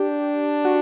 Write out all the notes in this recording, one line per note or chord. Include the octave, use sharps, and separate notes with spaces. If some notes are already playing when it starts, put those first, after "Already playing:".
Already playing: D4 G4
F#4